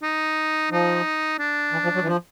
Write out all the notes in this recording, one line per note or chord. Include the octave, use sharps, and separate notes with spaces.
D#4
F3 D#4
D4
E3
F3
F#3
E3
F3